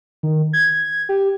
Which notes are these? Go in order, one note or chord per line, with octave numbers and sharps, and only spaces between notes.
D#3
G#6
G4